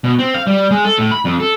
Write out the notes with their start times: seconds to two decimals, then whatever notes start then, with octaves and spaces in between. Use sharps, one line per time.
0.04 B2
0.19 C4
0.34 F5
0.47 G3
0.71 G#3
0.85 A4
0.99 A2
1.11 B5
1.25 F2
1.40 A4